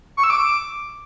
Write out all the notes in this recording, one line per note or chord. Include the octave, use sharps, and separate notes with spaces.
C#6
E6
D6